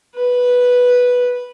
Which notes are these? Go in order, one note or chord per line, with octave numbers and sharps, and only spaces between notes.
B4